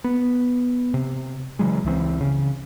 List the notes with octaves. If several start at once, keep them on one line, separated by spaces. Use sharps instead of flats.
B3
C3
C#3 E3 F#3 G#3
C#2 E3 G#3 C4
C#3